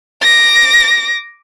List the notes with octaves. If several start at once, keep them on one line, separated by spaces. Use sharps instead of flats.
D6 A#6